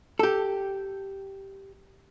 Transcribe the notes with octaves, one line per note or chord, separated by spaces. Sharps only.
G4 A4